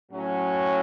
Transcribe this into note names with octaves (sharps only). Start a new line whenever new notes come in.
A2 F#3 C#4